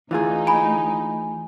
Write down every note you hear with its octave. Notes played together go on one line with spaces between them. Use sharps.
D2 E3 D#4 F4 G#4
G#5 B5